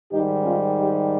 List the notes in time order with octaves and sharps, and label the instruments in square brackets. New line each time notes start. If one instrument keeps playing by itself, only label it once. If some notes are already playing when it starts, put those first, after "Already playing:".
[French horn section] G#2 D#3 G3 D#4 G4
C#4 F4
D#4 G4